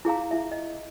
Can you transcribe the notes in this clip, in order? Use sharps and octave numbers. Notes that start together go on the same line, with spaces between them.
E4 G#4 F5 A#5
E4 E5
D#5